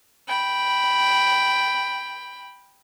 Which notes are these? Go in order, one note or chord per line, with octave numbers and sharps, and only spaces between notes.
G5 B5